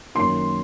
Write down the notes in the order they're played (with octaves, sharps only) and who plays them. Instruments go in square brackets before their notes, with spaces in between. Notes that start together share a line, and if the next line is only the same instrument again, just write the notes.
[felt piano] F#2 D#3 F#3 A#3 C6